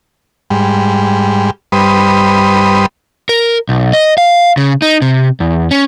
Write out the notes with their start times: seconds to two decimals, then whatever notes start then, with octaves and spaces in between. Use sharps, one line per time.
0.50 G#2 G3
1.72 G2 G3 B4 C5 D#6
3.29 A#4
3.69 B1
3.93 D#5
4.18 F5
4.57 C#3
4.82 D#4
5.02 C3
5.40 E2
5.71 C#4